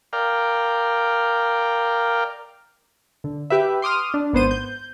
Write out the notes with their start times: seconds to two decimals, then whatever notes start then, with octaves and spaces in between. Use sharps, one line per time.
0.13 A#4 D5 F5 G5
3.24 D3
3.50 G4 B4 E5
3.82 C6 D6 D#6 F6
4.14 D4
4.33 G#1 B3 C5 D#7
4.51 G6